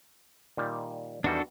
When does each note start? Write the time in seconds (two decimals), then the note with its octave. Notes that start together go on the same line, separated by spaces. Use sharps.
0.57 A#2 D#3 G3
1.24 E2 D#3 G3 D4 F#4 A4